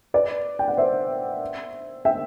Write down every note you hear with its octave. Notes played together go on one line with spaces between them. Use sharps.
B4 D5
G5
F#5
C5 E5
E5 G5